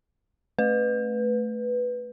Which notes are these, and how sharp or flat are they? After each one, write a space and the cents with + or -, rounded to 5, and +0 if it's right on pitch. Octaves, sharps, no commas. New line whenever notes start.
A3 +0 B4 +0